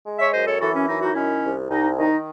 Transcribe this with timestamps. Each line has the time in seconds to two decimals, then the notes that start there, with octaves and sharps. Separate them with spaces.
0.06 G#3
0.19 C#5 E5
0.33 F#2 C5 D#5
0.48 A4 C#5
0.60 E3 F#4 A4
0.74 C#4
0.88 F#2 D#4
1.02 D#4 F#4
1.15 D#3 C#4 E4
1.43 C2
1.69 C2 D#4
1.97 D#3 D#4